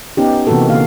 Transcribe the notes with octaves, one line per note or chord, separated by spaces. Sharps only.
B3 C#4 D#4 G4
C3 E3 A#3 B3 F#4 A4
D3 A#3 F5